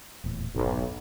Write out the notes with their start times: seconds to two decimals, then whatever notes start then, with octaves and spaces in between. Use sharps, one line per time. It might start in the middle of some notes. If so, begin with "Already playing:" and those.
0.24 D#1 E2 A2
0.55 F1 B1 G#2 B3